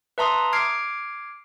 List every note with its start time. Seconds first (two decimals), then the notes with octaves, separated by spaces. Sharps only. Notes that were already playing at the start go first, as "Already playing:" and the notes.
0.18 B4 E5 A5 A#5 C6 D#6
0.53 D6 F6 G#6 C7 D7